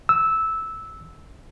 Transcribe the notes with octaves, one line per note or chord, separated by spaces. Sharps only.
E6